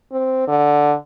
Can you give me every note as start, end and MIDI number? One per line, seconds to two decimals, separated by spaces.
0.12 0.44 60
0.48 0.94 50